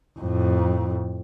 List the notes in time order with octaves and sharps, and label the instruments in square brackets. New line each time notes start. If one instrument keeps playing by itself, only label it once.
[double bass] F2 A2